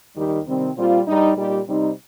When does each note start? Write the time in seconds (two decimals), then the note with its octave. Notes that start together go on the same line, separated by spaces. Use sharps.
0.16 D#2 D#3 G3 D#4 G4
0.47 C3 D#3 G3 C4
0.76 A#2 G3 C4 F4
1.07 G2 G3 D#4
1.37 A#2 G3 D#4 G4
1.67 C3 G3 C4 D#4